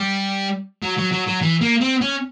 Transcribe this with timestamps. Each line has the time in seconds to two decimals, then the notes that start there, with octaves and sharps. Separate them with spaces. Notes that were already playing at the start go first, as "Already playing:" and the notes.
Already playing: G3
0.83 F#3
0.98 F#3
1.12 F#3
1.28 F#3
1.42 E3
1.62 A#3
1.81 C4
2.02 C#4